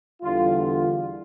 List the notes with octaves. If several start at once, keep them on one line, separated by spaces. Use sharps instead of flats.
E2 D3 G3 F4
F4